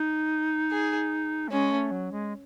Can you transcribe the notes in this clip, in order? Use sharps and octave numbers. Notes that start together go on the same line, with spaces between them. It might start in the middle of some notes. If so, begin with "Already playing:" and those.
Already playing: D#4
G#4
A3
G#3 C#4
A3
F#3
G#3